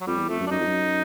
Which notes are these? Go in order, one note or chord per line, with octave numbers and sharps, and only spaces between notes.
F#3
F2 G3
E2
F2 A3
F#2
D4
F#2 D#4
F2
F#2